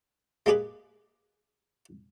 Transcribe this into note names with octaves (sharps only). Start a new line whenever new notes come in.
G#3 A#3 G4 G#4 B4